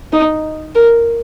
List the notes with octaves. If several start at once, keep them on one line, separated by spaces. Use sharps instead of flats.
D#4
A#4